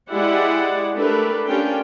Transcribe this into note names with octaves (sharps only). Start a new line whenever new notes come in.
G#3 E4 G4 G#4 D5 F#5
A3 D4 G4 A#4 B4
C#4 D4 F4 G4 A#4 G5